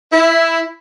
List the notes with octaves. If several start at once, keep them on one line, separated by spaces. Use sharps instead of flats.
E4